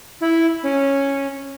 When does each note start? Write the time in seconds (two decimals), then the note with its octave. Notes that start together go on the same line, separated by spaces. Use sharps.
0.21 E4
0.63 C#4